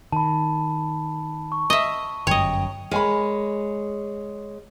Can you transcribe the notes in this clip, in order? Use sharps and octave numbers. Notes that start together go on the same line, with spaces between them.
D#3 A5 B5
C#6
D#5 E5
G1 F#2 C#5 D#5 G5
G#3 A#4 C#5 G#5 B5